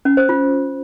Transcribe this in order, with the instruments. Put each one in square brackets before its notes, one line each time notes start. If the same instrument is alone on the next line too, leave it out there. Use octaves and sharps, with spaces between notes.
[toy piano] C#4
C5
F4